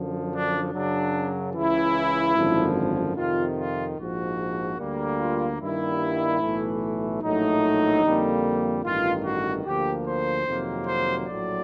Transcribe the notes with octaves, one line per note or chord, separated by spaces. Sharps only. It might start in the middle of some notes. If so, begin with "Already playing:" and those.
Already playing: F#2 D3 F3
D4
F#2 C#3 F#3 D4
C#2 C#3 E3 E4
G#1 F#2 D3 F3
F2 C3 D#3 F4
F4
A#1 G#2 F3 F#4
D2 D3 G3 A#3
F4
G2 D#3 G3 A#3 E4
B1 A2 E3 A3
A#1 A2 F#3 A3 D#4
F2 D3 G3 A#3
A1 G2 D#3 F4
F#4
D2 D3 F3 A#3 G4
C5
F2 C3 D#3 F#3 A#3
C5
A#1 A2 F#3 D5